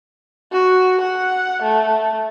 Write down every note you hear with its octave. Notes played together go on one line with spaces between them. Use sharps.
F#4
F#5
A3